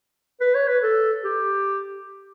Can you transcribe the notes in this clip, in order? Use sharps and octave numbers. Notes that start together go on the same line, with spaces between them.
B4
C#5
B4
A4
G4